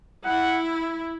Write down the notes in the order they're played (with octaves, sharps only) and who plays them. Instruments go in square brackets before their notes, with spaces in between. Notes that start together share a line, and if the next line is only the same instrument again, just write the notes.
[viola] E4 [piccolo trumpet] F#5